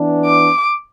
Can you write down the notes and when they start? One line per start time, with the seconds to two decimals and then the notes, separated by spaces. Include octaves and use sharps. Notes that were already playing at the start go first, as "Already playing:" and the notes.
Already playing: E3 B3 D4
0.26 D6